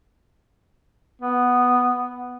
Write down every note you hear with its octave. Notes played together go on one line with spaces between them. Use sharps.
B3